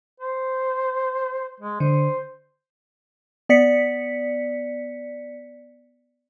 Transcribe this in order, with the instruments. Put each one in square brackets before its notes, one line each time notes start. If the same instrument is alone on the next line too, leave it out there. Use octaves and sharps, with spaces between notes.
[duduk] C5
G#3
[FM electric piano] D3 [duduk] C5
[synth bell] B3 D5 B6 C#7